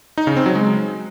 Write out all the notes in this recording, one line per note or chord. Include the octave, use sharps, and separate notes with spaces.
D#4
C#3
C4
F#3
G#3